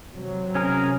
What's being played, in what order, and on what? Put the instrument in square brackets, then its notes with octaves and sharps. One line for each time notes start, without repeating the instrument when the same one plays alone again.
[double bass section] C3 F#3
[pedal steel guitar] C#4 G#4 A#4